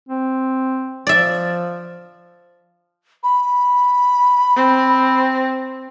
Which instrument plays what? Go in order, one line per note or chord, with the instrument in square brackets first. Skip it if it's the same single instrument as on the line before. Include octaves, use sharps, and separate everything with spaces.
[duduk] C4
[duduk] F3 [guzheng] D5 E5
[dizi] B5
[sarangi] C4